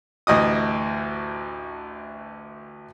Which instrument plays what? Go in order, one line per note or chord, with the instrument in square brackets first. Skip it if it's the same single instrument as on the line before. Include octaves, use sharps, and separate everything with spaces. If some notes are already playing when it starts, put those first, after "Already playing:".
[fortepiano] A1 D2 D#5 D#6